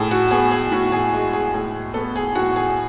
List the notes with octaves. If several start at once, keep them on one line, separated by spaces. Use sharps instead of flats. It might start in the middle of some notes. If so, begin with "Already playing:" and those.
Already playing: A2 G#4
F#4
B3 G#4
G#4
A2 F#4
G#4
G#3 F#4
G#4
A2 G#4
B3 A4
G#4
A2 F#4
G#4